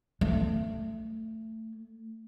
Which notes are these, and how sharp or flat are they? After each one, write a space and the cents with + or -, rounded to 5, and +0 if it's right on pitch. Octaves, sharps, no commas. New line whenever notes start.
A3 +20